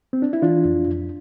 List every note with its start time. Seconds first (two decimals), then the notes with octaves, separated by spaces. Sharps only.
0.13 C4
0.22 D4
0.33 E4
0.42 E3 D4 F4
0.65 F2
0.88 F2